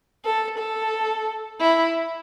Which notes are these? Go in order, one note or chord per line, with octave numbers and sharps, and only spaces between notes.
A4
A4
E4